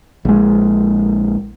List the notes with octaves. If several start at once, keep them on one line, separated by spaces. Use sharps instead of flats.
A#1 G#3